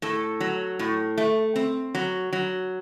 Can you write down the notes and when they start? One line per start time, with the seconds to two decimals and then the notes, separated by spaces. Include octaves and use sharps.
0.02 A2 A4
0.40 F#3
0.79 A2
1.18 A3
1.56 C4
1.95 F#3
2.33 F#3